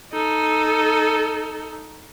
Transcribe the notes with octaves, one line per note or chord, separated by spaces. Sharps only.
D#4 A4